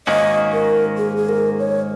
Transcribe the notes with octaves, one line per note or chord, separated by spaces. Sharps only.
G#2 D#3 A#3 C#4 F#4 D#5
A#4
G#4
G#4
A#4
C#5